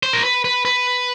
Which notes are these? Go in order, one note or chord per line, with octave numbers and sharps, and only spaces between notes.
C5
A#4
B4
B4
B4